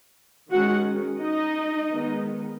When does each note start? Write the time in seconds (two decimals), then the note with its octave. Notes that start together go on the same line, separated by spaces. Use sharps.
0.51 D#3 G#3 C#4 F#4 F#5
1.20 D#4 D#5
1.91 D#3 G#3 B3